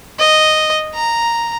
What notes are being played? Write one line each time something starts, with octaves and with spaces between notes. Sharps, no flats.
D#5
A#5